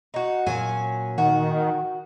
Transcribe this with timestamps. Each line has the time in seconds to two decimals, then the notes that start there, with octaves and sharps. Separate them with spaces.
0.14 D#4 F#4
0.46 A#2 F#3 A3 C#4 G#5
1.18 D#3 F#4